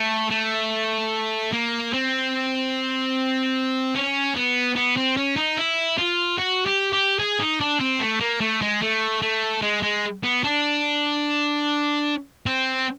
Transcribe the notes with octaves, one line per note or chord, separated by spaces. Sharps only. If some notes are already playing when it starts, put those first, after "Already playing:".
Already playing: A3
A3
A#3
C4
C#4
B3
B3
C4
C#4
D#4
E4
F4
F#4
G4
G4
G#4
D#4
D4
C4
A3
A#3
A3
G#3
A3
A3
G#3
G#3
B3
D4
C4